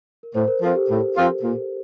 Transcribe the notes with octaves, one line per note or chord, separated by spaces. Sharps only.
A#4
A2 C5
A#4
F3 C4 F4 A4
G4
A2
F3 C4 F4
A#2